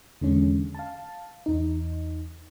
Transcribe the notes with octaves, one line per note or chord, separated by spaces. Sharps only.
E2 D3 G#3 C#4
F5 A5
E2 D#4